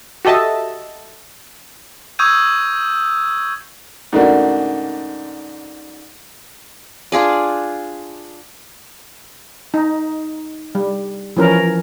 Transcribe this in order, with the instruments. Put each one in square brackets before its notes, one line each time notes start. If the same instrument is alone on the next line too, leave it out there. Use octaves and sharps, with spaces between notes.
[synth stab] F#4 G4 A4 D#5 E5 A5
[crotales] C#6 D#6 E6 G6 G#6 D#7
[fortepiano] G#2 C#3 A3 A#3 D4 F#4
[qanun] D4 F4 G#4 D5
[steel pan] D#4
G3
E3 F3 C#4 A#4